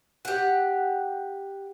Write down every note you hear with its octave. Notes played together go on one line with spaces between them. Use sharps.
G4 F#5